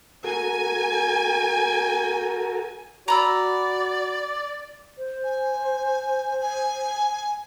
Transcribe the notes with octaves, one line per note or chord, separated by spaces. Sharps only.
F#4 A4 A#4 G#5
F#4 D5 A#5 B5 E6
C5
G#5
G#5